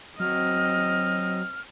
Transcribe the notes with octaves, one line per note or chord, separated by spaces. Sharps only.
F#3 C4 D#5 F6